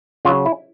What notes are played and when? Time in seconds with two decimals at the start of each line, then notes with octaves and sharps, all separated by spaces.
0.25 C#3 F4
0.28 F#3
0.46 E4